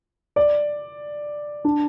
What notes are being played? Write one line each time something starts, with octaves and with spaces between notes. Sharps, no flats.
D5
D4